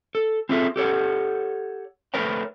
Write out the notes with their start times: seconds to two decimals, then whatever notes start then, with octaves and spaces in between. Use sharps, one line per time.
0.15 A4
0.49 C4 F4 G#4 A4 E5
0.76 G4 A4 C#5 F#5
2.14 A3 A#4 B4 C#5 G5